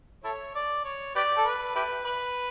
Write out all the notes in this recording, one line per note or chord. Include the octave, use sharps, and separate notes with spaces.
E4 A4 C#5
D5
C#5
G4 B4 D5
A4
B4
E4 G4 B4
B4